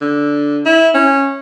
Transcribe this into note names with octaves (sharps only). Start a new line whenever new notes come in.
D3
E4
C#4